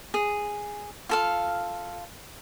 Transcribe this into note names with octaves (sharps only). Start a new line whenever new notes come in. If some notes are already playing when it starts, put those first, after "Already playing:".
G#4
F4 A4 F5